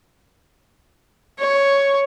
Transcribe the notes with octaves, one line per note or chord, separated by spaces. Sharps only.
C#5